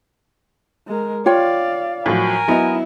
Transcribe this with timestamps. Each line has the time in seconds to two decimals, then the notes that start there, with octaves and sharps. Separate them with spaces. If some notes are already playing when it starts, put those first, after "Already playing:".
0.88 G#3 A#4
1.26 F4 C#5 D5 F5 G5
2.06 A2 F3 F#3 A#4 G#5 A#5
2.48 F#3 B3 E4 D#5